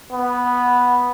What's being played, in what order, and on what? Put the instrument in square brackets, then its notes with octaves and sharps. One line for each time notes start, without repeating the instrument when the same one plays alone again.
[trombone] B3